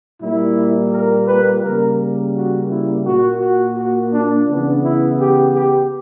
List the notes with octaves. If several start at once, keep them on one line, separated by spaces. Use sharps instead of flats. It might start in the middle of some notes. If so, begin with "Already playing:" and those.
A#2 G3 A#3 E4
A#4
B4
C#3 G3 A#3 A#4
F#4
E4
A#2 A#3 F#4
F#4
F#4
D4
C#3 E3 B3 D4
E4
G4
G4